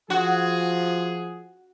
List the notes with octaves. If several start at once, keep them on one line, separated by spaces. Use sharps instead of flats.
F3 F#4 G#4